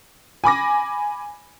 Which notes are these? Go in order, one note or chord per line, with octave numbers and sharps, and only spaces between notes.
G#5 B5 D6 A#6